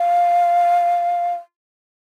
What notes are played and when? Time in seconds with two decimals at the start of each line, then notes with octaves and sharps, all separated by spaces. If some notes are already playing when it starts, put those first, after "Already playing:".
Already playing: F5